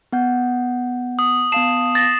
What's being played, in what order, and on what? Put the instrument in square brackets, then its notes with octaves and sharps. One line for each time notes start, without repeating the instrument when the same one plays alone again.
[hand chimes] B3 F#5 G6
[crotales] D#6
[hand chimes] B3 F5 A5 [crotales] C7 E7
[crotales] A6 A#6